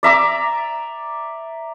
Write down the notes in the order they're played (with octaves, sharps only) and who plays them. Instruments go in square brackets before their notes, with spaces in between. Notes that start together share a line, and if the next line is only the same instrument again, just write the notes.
[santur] D5 E5 A#5 D6